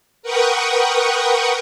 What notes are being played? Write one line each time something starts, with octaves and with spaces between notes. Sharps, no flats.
A#4 B4 F#5 G5 C#6 D#6